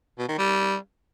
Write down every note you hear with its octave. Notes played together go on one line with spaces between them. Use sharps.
B2
D#3
G3